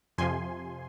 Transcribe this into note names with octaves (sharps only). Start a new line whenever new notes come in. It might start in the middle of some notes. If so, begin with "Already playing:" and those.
F2 C3 F3 G#5 C6